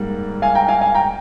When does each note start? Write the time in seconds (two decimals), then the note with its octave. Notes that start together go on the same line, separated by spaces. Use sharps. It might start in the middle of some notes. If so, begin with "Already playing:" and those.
Already playing: G#2 G3 A#3
0.42 F5 G#5
0.55 G5 A#5
0.68 F5 G#5
0.81 F5 G#5
0.95 G5 A#5